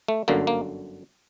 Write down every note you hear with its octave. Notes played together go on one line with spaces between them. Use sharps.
A3
G1 F#2 D3 A#3
A#3